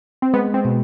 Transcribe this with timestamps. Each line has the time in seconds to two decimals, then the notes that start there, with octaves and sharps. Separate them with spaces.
0.22 C4
0.34 G#3 B3
0.54 C4
0.65 B2